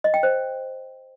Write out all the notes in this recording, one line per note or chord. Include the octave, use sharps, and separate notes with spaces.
D#5
G5
C5